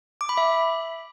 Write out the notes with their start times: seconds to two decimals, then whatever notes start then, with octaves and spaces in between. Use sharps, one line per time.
0.21 D6
0.29 B5
0.37 E5